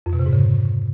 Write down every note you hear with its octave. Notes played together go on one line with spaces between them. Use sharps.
F2
B2
C3
G#2
C#3